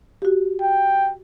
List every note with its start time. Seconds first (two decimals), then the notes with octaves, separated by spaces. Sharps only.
0.22 F#4 G4
0.62 G5